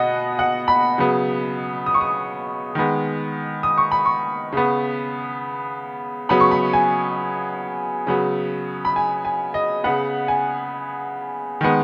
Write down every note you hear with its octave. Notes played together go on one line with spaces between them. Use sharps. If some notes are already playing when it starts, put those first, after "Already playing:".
Already playing: B2 B3 D#5 F#5
F#5
B5
C#3 F#3 B3
D#6
C#6
D#6
D#3 G#3 B3
D#6
C#6
B5
C#6
C#3 B3
C#3 F#3 B3 B5
C#6
B5
G#5
C#3 F#3 B3
B5
G#5
G#5
D#5
C#3 B3 F#5
G#5
D#3 G#3 B3